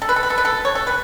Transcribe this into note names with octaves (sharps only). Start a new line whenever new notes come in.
A4
B4
A4
B4
A4
B4
A4
C#5
A4
B4